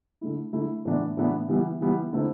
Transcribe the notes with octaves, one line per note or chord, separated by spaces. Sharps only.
D3 A3 E4
D3 A3 E4
A2 E3 B3 D4
A2 E3 B3 D4
E3 G3 B3 E4
E3 G3 B3 E4
D3 A3 C4 E4